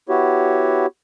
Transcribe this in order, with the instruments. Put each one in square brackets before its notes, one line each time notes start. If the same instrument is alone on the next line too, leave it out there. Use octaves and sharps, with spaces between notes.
[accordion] B3 E4 F#4 G4 C#5